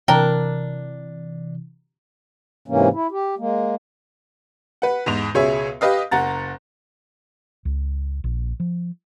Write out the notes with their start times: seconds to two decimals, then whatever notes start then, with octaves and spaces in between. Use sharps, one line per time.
0.08 C3 E3 D4 A#4 G5
2.68 G#2 C3 E3 A#3 C#4
2.93 E4
3.11 G4
3.38 G#3 A#3
4.82 B4 F#5
5.06 E2 G#2 F7
5.34 C#2 B2 G#4 C#5 E5
5.81 G4 B4 D#5 F5
6.11 F#1 F#5 A#5 A6
7.65 C#2
8.24 A#1
8.60 F3